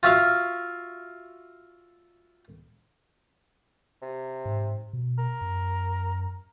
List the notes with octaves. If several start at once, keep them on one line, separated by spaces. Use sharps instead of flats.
F4 F#4 E5 F5
C3
G#2
B2
A#4
F#2